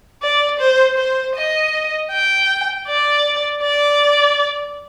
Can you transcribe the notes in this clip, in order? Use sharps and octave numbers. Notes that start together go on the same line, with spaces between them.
D5
C5
C5
D#5
G5
D5
D5